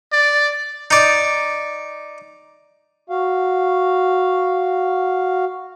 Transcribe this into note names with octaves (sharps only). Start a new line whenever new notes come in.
D5
D#4 D5
F#4 F5